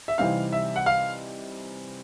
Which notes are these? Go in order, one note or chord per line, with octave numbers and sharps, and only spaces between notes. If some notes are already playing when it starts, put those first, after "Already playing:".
E5
C3 E3 G3 C4 D#4 F5
E5
F#5
F5